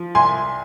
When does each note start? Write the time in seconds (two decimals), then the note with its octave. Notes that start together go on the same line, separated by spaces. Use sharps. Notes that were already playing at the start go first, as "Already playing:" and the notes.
Already playing: F3
0.15 C2 G#5 C6